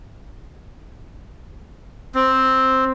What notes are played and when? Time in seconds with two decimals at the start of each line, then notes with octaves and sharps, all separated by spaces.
2.15 C4